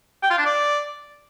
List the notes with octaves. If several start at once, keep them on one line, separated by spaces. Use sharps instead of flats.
G5
F4
D4
D5